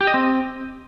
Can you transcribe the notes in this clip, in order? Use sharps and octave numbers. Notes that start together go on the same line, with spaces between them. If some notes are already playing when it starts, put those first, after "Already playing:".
G4
D#5
C4